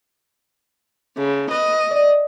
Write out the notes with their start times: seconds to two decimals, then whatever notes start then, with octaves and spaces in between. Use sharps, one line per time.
1.17 C#3 A3
1.51 B4 D#5
1.91 D5